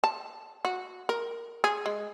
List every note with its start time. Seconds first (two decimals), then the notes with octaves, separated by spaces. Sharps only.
0.04 A5
0.65 F#4
1.09 A#4
1.64 G#4
1.86 G#3